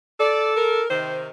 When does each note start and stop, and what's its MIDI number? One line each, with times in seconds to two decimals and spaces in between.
0.20 0.83 69
0.20 0.51 74
0.56 0.89 70
0.90 1.29 48
0.90 1.29 51
0.90 1.19 72